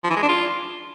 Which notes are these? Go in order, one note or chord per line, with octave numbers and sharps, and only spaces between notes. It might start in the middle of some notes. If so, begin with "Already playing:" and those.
F3
E3
G#3
D4
F4